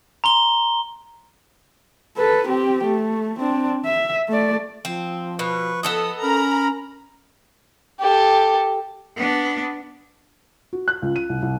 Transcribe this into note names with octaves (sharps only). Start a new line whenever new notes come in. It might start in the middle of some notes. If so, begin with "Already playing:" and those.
A#5 C6 G7
A4 B4
C4 G4
A3
C4 D4
E5
A3 D5
F3 C4
B2 B4 C#6
B3 A4 D#5 D#6
C#4 A#4 A#5 B5
G4 A4
B3 D4
F#4
F#6
C#2
D#7
C2
C2